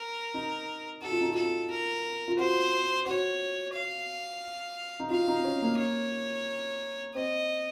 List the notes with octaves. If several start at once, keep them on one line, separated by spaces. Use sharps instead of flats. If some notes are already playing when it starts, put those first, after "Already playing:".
Already playing: A#4
D#4
F#4 A4
F4
D#4
F4 A4
A#4
F4
F#4 C5
F#4 C#5
F5
D#4
F4 F5
D#4
C#4
A#3
C#5
C4 D#5